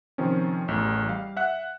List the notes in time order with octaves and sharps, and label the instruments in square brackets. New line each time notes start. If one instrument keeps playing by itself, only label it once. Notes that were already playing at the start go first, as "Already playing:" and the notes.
[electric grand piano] C3 D#3 F3 C4 C#4
A1 E2
G3 F5
E5 F#5 F#6